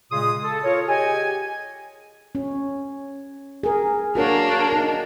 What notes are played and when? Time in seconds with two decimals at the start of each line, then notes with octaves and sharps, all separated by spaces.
0.12 A#2 C#3 G#3 G#4 C6 D#6
0.43 A4
0.64 F4 A4 A#4 C#5
0.88 G4 G#4 D#5 G#5
2.35 C#4
3.63 G#4 A#4
4.15 A#3 D4 F#4 A#4 C#5
4.73 D#4